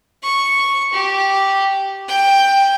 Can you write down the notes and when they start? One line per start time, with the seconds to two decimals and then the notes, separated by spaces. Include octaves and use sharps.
0.23 C#6
0.93 G4
2.08 G5